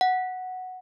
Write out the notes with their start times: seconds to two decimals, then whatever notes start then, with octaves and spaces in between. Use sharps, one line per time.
0.01 F#5